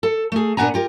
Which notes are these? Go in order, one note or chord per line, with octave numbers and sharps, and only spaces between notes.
A4
A3 G#4
A#2 B3 D4 F#5 G#5 A#5
F4 G4 A#4